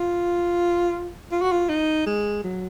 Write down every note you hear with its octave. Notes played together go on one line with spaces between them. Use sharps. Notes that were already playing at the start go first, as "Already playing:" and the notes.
Already playing: F4
F4
F#4
F4
D#4
G#3
F#3